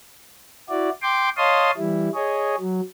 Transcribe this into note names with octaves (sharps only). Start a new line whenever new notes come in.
E4 F#4 D5
G5 C6 D6
C#5 D#5 F5 A5 C6 D#6
E3 G3 E4
G#4 C#5 D#5
F#3